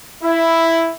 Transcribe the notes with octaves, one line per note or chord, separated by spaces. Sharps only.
E4